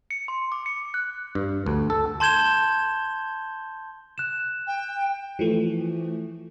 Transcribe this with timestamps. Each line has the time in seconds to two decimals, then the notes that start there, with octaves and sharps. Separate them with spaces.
0.11 C#7
0.28 C6
0.52 D6
0.66 C#7
0.94 F#6
1.35 G2
1.66 D2
1.90 A4
2.20 A5 C6 G6 G#6 E7 G7
4.18 F#6 E7
4.67 G5
5.39 E3 F3 A3